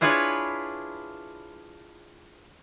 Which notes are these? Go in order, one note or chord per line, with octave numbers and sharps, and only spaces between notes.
D4 E4 F4 G#4 B4 C#5